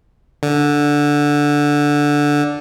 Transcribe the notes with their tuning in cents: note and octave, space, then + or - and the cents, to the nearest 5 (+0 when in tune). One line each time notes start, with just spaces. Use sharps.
D3 -5